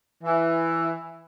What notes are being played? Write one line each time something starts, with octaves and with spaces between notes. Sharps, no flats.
E3